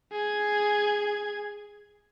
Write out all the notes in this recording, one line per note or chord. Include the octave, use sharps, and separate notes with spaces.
G#4 G#6